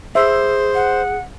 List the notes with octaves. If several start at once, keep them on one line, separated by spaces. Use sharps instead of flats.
G#4 C5 E5
F#5